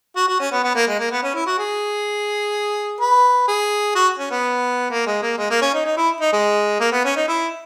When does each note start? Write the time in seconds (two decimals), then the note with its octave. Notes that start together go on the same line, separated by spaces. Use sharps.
0.16 F#4
0.28 F#4
0.40 C#4
0.51 B3
0.63 B3
0.75 A#3
0.87 G#3
0.99 A#3
1.11 B3
1.23 C#4
1.35 E4
1.46 F#4
1.58 G#4
3.00 B4
3.48 G#4
3.95 F#4
4.19 C#4
4.31 B3
4.90 A#3
5.07 G#3
5.22 A#3
5.38 G#3
5.50 A#3
5.62 C#4
5.74 D#4
5.85 D#4
5.97 E4
6.21 D#4
6.33 G#3
6.80 A#3
6.92 B3
7.05 C#4
7.16 D#4
7.28 E4